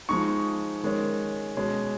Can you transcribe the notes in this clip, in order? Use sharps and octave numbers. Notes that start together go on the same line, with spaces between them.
F3 G#3 D#4 C#6
D#3 G#3 C#4
B2 G#3 C#4